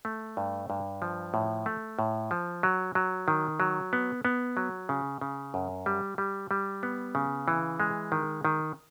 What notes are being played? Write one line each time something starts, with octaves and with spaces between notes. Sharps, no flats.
A3
G2
G2
F3
A2
A3
A2
F3
F#3
F#3
D#3
F#3
B3
B3
F#3
C#3
C#3
F#2
G3
G3
G3
B3
C#3
E3
G#3
D#3
D#3